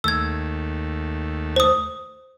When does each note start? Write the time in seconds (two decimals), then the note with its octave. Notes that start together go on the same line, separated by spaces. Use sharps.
0.04 D#2 A3 E6 G#6
1.56 C5 D#6